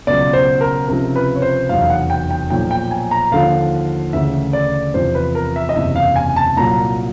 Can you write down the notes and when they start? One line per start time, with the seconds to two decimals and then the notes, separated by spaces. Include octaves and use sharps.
0.07 C#2 B2 F#3 D5
0.33 C5
0.61 A#4
0.88 C#2 C3 F3 A#4
1.16 B4
1.35 C#5
1.42 C5
1.69 F1 E2 B2 F#3 F5
1.81 F5
1.90 F#5
2.10 G5
2.31 G5
2.50 B1 A#2 F3 G5
2.71 G5
2.91 G#5
3.11 A#5
3.32 D#2 D3 F3 F5
4.13 D2 C#3 E3 E5
4.53 D5
4.94 E2 C3 F3 C5
5.15 B4
5.35 A#4
5.56 E5
5.69 D#5
5.76 F#1 E2 C3 E3 E5
5.96 F5
6.16 G#5
6.36 A5
6.56 C2 A#2 F#3 A#5